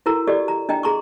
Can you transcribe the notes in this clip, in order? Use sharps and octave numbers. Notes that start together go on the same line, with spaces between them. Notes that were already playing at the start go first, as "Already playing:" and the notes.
E4 F#4 A4 A#4 A#5
F#4 G4 A4 D5 D#5
A#5
D4 D#5 G5 A#5
G#4 A#5 C6 C#6